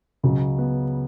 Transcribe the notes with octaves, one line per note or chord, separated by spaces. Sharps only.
C#2 C#3 F#3
B3